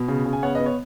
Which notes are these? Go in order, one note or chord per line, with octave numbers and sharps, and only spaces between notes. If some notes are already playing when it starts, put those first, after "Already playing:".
Already playing: B2
C#3
C#3
G#5
B3 C#5 F#5
B4 D#5
B3
C#5